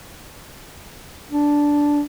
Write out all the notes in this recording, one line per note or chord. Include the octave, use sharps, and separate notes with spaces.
D4